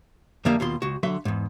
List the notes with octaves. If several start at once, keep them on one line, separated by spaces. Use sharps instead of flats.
F2 D3 G3 A#3 D5 E5
D#2 B2 F4 C6
C#2 F#4
D3 F#3 E5 C6
E2 G#2